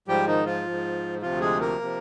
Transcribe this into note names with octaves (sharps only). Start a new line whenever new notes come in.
G#2 F3 G3 G4
D#3 D#4
F3 F4
G#2 F3
D2 C3 F3 F4
G#3 G#4
A#3 A#4
C3 F3